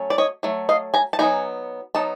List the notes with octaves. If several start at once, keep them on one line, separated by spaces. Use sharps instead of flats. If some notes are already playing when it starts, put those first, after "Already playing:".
Already playing: F#3 A3 C#4
D5
C#5 D#5
F#3 A3
D#5 F5
G#5 A#5
A5
F#3 B3 D#4 G#5 A#5
F#3 B3 D#4 A5